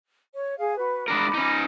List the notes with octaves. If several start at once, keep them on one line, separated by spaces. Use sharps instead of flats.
C#5
G#4 F5
F#4 B4
G#3 D4 A#4 B5 D6
C#4 D#4